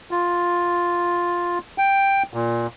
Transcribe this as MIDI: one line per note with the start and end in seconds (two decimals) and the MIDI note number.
0.11 1.59 65
1.78 2.23 79
2.34 2.67 46